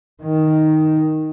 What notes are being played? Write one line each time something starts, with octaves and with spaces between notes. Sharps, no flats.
D#3